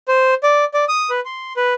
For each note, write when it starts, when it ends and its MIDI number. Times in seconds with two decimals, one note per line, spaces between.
0.08 0.34 72
0.43 0.65 74
0.74 0.85 74
0.88 1.10 87
1.10 1.20 71
1.25 1.53 84
1.57 1.74 71